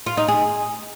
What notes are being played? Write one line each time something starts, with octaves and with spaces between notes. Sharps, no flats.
F4
D#4
G#4